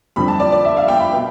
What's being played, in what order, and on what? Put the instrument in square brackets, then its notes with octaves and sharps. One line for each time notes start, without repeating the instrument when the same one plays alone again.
[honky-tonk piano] F2 D3 G3 C4 B5
A5
D5
D5
E5
F5
G5
B5
B2 B3